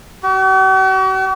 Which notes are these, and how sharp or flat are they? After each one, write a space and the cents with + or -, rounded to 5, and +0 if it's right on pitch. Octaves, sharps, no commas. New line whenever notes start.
F#4 +45